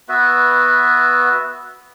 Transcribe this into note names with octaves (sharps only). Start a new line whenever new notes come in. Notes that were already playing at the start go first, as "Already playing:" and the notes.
B3 F#4 B4 E5